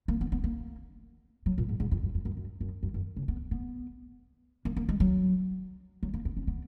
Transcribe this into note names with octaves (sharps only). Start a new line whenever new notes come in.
A#3
B3
B3
A#3
F#3
A#2
G#2
G#2
F2
F#2
F2
F#2
F#2
F#2
F#2
F#2
C#3
B3
B3
A#3
A#3
G#3
F#3
F#3
A#3
B3
C#4
B3